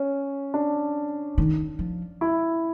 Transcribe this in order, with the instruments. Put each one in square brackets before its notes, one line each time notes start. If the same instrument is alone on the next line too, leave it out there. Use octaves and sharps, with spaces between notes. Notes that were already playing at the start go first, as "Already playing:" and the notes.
Already playing: [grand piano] C#4
D4
[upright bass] D#3
F3
[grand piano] E4